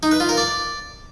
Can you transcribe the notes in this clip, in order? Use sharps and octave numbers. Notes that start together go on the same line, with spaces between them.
D#4
B4
F4
A#4
D5